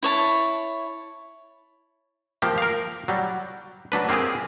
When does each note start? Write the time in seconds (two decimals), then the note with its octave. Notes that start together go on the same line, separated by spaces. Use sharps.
0.03 E4 C#5 A5
2.42 F3 A#3 G4
2.58 A#4 F5
3.08 F#3 G3
3.92 F#3 D4 B4
4.09 A#3 C4 F4 G4 G#4